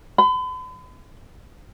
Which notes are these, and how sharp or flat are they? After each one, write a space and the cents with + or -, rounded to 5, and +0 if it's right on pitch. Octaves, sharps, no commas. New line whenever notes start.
B5 +45